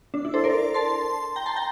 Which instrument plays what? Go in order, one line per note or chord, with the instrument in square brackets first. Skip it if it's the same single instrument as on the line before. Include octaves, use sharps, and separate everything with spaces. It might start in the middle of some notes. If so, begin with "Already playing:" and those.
[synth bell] D4
E4
A4 C5
A#4 D5
A5 C6
G5 A#5
A5 C6
G5 A#5